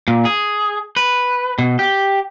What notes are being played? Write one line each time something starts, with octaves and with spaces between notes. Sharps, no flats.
A#2
G#4
B4
B2
G4